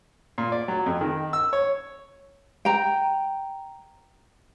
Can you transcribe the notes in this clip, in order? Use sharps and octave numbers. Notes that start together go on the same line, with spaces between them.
A#2
D5
F#3
F2
D#3
E6
C#5
G5 A#5